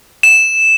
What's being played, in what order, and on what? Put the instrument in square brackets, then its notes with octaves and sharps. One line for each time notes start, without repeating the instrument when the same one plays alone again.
[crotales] E7